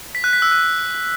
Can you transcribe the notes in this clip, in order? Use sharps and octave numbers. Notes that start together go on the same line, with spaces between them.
B6
F#6
B6
E6
F#6